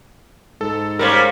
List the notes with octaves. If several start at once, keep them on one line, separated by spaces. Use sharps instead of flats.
G#2 A4
G3 A#3 C#4 A#4 C5